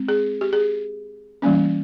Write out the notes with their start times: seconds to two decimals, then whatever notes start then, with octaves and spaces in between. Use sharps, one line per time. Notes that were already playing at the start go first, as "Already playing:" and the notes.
Already playing: G#3 C4
0.08 G#4
0.41 G4
0.53 G#4
1.42 E3 G3 A#3 C#4